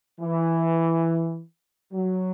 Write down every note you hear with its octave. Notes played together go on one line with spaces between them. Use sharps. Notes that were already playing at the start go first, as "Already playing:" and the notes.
E3
F#3